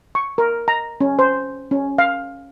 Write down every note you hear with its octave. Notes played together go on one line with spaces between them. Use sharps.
C#6
A#4
A#5
C#4
C5
C#4
F5